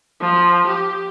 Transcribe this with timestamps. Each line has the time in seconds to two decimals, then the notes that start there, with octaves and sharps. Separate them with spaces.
0.19 F3
0.68 G4